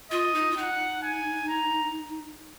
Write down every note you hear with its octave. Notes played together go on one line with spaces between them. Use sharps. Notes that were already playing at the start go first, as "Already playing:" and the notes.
F4 D#5
D#4
F4
D#4 F#5
G#5
A#5